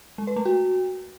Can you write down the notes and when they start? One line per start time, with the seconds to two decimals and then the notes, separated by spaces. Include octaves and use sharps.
0.18 G#3
0.27 B4
0.36 A3
0.45 F#4